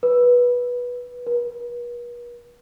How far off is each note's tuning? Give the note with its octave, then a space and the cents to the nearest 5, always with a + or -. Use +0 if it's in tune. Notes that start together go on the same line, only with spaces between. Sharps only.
B4 -15
B4 -45